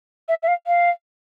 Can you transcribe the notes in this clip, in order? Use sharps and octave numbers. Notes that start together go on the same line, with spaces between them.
E5
E5
F5
F5